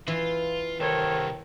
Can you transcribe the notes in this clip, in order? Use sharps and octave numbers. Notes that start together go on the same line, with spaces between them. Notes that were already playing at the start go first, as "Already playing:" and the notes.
E3 F4
C2 G2 D#3 A4 C5 C#5